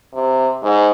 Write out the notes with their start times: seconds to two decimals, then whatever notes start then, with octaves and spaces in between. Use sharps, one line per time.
0.13 C3
0.63 G#2